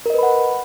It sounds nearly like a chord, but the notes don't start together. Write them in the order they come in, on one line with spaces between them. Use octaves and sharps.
A#4 D#5 B4 B5 F#5